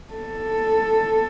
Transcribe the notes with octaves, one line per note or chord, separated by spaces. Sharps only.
A4